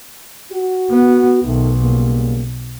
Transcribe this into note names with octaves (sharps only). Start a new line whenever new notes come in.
F#4
B3
B1 D#3 A3
C#3 G3 A#3